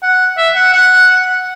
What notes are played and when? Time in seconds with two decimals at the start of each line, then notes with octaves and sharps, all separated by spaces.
0.03 F#5
0.38 E5
0.56 F#5
0.73 F#5